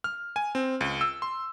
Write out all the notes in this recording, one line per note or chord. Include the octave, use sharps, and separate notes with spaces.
F6
G#5
C4
C#2
E6
C6